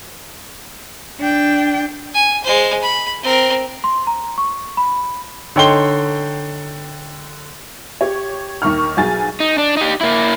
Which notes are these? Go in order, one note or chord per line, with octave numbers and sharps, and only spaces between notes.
D4 G5
G#5
G#3 C5
B5
C4 A#4
C6
A#5
C#6
B5
D3 D#4 C#5 G5 C6 G7
G4 C#5
D#2 D#3 C#6 F6
B1 F#4 G#4 G#5 A6
D#4
D4
D#4 G4
A#3 E4